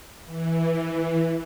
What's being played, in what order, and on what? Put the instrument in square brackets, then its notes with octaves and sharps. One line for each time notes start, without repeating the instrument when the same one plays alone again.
[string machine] E3